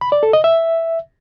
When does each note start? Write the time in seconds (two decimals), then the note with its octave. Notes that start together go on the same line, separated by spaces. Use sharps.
0.01 B5
0.12 D5
0.23 A4
0.33 D#5
0.44 E5